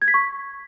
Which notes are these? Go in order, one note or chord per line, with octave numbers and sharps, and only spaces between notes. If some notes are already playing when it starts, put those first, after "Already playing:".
G#6
B6
C#6